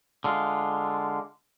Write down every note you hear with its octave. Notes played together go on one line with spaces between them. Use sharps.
D3 G#3 F4